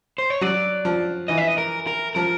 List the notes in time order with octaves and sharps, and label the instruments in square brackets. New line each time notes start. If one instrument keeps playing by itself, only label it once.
[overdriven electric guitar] C5
C#5
[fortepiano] F#3 [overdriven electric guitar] D5
[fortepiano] F3
[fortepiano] E3 [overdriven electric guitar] D#5
[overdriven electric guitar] E5
D#5
A#4
A#4
[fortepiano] F3 [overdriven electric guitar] A#4